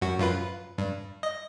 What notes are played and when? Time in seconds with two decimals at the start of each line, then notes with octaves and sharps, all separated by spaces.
0.01 F#2 F#4
0.19 F#2 F4 B4
0.78 G2
1.23 D#5